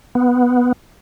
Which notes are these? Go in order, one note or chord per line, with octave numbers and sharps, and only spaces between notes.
B3